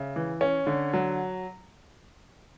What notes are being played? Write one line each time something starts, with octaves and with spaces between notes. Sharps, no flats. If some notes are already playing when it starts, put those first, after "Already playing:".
Already playing: C#3 E5
E3
C#4
D3
F#3